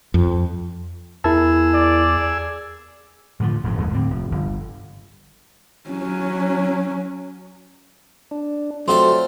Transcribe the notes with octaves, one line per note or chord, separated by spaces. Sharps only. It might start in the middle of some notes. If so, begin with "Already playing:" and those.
F2
E2 E4 G#4 A#4 A5 E6
D5
A2 D3 D#3 F3
D#1 G#1 G2 F3
E1 D#2 G#3
A2 D3 C4
F1
G1
F#3 C#4
D4
F#3 A3 C4 F4 D5 C6